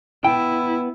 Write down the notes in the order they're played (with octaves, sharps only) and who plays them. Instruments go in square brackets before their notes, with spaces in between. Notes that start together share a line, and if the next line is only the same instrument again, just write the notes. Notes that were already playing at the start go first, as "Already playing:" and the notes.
[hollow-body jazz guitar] B3 G5 [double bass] E4